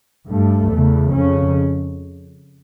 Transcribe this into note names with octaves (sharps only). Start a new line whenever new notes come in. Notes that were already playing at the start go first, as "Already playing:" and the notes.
G2 A3
E2 C#3
F2 C#3 C#4